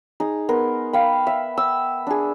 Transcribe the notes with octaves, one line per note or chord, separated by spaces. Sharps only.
D#4 G#4
B3 A#4 C6
F5 G5 B5
E5
E6
D4 G#4